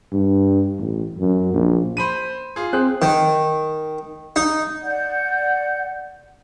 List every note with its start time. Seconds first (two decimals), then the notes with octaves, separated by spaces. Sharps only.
0.12 G2
0.79 A1
1.19 F#2
1.54 A#1
1.97 C5 B5 D#7
2.56 F4 G#4
2.73 C4 G#4 C5 F#6
3.02 D#3
4.36 D#4
4.83 D5 F#5 G6